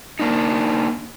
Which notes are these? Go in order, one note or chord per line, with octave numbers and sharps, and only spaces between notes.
A#3 D4 D#4